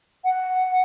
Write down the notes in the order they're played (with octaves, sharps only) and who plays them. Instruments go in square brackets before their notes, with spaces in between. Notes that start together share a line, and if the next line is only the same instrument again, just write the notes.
[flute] F#5